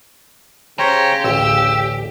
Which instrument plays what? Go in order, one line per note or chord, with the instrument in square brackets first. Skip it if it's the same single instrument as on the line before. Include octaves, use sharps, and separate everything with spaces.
[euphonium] C#3 [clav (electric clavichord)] C#4 [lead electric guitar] G4 [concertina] C5 C#5 A#5
[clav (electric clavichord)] A1 D2 [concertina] E6